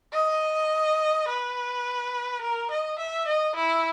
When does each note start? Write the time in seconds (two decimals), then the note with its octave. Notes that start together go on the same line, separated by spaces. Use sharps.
0.13 D#5
1.28 B4
2.41 A#4
2.71 D#5
2.99 E5
3.27 D#5
3.56 E4